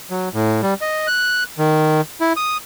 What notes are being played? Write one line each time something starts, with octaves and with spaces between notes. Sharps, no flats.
F#3
A2
G3
D#5
F#6
D#3
E4
D#6